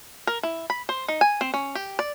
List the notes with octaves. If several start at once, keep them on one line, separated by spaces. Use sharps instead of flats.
A#4
E4
B5
C5
D#4
G#5
C4
C#4
G4
D5